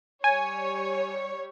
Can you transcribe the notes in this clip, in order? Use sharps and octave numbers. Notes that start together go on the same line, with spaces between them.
G3 C#5 G#5